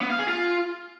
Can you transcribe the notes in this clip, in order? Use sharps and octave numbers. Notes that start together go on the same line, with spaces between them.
B3
F5
G#4
F4